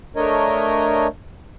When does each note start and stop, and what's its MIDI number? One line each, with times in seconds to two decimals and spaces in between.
0.16 1.07 57
0.16 1.07 62
0.16 1.07 70
0.16 1.07 73
0.16 1.07 75